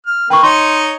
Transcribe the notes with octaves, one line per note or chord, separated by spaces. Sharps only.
F6
A#3 B4 G5 C#6
D#4 C#5 D#5 C6